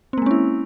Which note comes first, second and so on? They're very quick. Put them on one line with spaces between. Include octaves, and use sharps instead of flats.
C4 A#3 G#3 C#4 E4